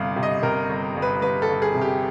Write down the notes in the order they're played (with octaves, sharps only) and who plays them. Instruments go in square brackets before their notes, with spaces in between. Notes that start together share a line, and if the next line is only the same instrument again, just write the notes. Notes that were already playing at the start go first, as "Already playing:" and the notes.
Already playing: [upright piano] G1 C3 F5
C3
D#5
C3 A#4
G1
G1
B4
G1 B4
A4
G1
G#4
C3
G4